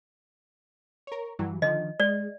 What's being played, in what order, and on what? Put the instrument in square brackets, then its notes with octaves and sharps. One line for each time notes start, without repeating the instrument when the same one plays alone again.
[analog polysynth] A#4 C#5
G2 E3 F#3
[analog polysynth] D3 D#3 F3 [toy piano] D#5
[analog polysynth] G#3 [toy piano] D5